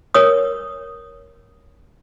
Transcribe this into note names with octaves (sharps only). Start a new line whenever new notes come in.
A#4 C#5 D#6